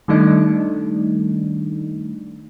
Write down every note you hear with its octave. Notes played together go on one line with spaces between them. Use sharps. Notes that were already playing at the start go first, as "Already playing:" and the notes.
D#3 G3 A3 D4 D#4